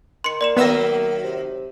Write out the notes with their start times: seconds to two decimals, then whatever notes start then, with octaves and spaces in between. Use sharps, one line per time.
0.24 D#3 C6 C#7
0.41 A#3 D5 C6 E7
0.57 D#3 F#3 A#3 B3 E5 E6 A#6
1.23 C3